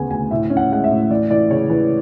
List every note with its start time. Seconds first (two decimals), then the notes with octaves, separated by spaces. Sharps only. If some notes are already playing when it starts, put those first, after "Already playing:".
Already playing: D2 C#3 B3 G#5
0.10 D2 G#5
0.31 A2 E5
0.50 C#4
0.57 F#5
0.71 G#3 F#5
0.84 E5
0.91 A2
1.10 E3 D5
1.30 E3 D5
1.50 C#3 C#5
1.70 E3 B4